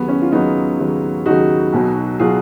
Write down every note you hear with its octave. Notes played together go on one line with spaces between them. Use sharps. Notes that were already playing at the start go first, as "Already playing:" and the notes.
Already playing: D#2 C#3 F#3 B3
C#4
F4
D#2 C#3 F#3 B3 D#4
D#2 C#3 F#3
D#2 C#3 F#3 D#4 F#4
B1 B2 F#3
B2 F#3 F4 G#4